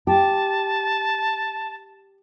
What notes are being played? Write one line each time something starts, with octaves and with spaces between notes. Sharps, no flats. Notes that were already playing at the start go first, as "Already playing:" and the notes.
G4 A5